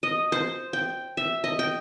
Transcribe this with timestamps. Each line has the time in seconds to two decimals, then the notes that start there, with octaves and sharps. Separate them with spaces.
0.03 D#5
0.32 C5
0.73 G5
1.17 E5
1.44 D#5
1.59 G5